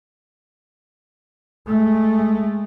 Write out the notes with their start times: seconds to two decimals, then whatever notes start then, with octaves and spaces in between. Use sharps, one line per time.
1.68 G#3 A3